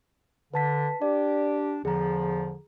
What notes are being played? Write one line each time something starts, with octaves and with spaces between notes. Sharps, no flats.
D3 B4 A5 B6
D4 G4 D5
E2 D3 F3 G#4 A#5